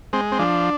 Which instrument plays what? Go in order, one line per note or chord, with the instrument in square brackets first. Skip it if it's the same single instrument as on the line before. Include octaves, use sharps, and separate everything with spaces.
[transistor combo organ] G#3 C4
C4
F3 D4